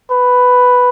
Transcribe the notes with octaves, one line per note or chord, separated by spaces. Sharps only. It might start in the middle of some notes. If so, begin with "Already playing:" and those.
B4